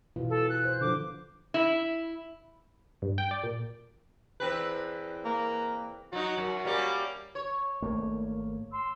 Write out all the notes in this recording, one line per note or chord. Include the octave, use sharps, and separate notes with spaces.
B2 E3 F4
A4
F#6
C5
D3 F3 D6
E4
G2
G5
D5
A#2
E2 C4 B4
A#3
F#3 D#4 F#4
F#2
G3 A#3 C#4
C#5
G#1 A3 A#3
C6 E6